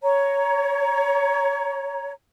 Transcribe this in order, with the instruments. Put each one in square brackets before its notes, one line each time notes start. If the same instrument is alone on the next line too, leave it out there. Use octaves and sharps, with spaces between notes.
[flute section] C#5 A#5